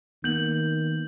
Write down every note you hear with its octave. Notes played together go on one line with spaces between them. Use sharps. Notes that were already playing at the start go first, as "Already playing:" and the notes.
D#3 A#3 B3 G6 F#7